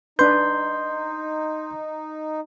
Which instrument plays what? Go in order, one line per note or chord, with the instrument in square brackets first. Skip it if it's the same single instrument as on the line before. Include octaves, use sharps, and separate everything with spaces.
[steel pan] D4 B4 [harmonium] D#4 [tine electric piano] C6 G6